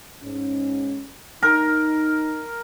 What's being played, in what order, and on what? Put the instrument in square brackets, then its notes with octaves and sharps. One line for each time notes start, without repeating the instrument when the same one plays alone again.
[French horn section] G#2 C#4
[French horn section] D#4 [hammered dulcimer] A#4